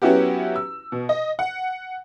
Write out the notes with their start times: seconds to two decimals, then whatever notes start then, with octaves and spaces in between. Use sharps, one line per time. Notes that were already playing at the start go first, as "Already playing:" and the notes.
0.02 F#3 B3 C#4 E4 F#4 G4
0.56 E6
0.92 B2
1.09 D#5
1.39 F#5